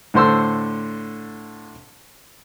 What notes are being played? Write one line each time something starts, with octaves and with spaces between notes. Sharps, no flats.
A2 D3 C5 C6 E6